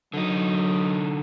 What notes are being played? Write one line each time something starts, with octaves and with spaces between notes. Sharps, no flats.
D3 F#3 D#4